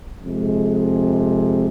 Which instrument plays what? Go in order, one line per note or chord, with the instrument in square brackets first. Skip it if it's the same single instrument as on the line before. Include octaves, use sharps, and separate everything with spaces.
[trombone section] F2 C3 G#3